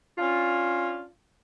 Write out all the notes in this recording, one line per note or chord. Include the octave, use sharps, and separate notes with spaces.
C#4 D4 F4